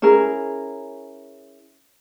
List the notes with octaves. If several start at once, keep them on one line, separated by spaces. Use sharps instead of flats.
C#4 E4 G#4 A#4